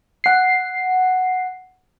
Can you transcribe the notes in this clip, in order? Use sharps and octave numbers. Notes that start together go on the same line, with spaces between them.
F#5 C7